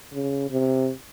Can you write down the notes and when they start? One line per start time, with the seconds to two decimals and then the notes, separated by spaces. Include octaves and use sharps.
0.13 C#3
0.50 C3